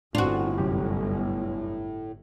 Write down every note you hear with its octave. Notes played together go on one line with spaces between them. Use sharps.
G1 A2 C4 D4 F4 F#4
C2 F#2 G4